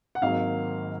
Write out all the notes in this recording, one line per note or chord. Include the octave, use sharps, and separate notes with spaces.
F#5
G#1 G#2 D#3 F#3 A#3 F5